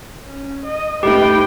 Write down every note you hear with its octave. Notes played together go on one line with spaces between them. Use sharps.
C#4
D#5
G2 A3 D#4 G4 B4 G5